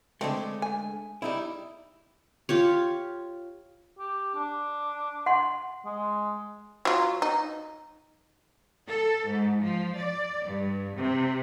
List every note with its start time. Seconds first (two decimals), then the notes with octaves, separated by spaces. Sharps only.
0.21 D3 G#3 A3 C4
0.62 G#5
1.22 G3 D#4 E4
2.49 F4 G4 C#5
3.99 G4
4.35 D4
5.26 F#5 C6
5.86 G#3
6.85 F#3 F4
7.22 D#4
8.87 A4
9.25 G#2
9.61 F3
9.95 D5
10.43 G2
10.96 C3